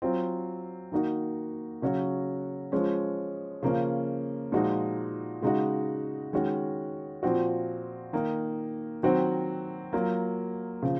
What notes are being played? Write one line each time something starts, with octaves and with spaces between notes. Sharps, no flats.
F#3 C4 F4
D#3 A#3 D#4 F#4
C#3 F#3 C#4 F#4
F3 G#3 C#4
C#3 F3 A#3 C#4
A#2 F3 G#3 D#4 F#4
C#3 G#3 D#4 F#4
D#3 G#3 C#4 F#4
A#2 F3 C4 F#4
D#3 A#3 D#4
D#3 F#3 C4 F#4
F#3 A#3 F4
C#3 F3